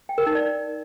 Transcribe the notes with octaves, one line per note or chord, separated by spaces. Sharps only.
G5
A#4
D#4
D5